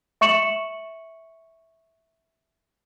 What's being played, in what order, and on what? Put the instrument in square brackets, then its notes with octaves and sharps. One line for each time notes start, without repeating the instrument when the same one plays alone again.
[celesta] E5 C#6 C#7 E7 F#7